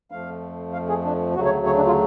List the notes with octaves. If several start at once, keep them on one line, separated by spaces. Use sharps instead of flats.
F2 F3 A3 F5
F5
G#4
D4
D2 C#3 F#3 A3 F#4
C#5
C#5
D4
F4